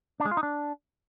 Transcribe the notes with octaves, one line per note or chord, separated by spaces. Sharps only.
D4
G#3
F4
D#4
D4